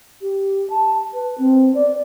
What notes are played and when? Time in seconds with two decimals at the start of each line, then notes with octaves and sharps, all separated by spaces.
0.21 G4
0.70 A5
1.13 B4
1.38 C4
1.75 D5